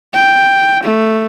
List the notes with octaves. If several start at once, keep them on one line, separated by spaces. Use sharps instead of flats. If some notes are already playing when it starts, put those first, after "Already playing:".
G5
A3